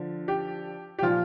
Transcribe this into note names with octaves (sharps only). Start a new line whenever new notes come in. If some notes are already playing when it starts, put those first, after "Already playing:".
Already playing: D3 F3
G4
G4
A#2 F3 F4